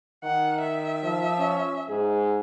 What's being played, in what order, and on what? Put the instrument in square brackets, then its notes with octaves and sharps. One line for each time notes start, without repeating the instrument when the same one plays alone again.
[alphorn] D#3 [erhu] F#5
[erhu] E5
[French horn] F3
[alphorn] C#4
[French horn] G#2 [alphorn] G#4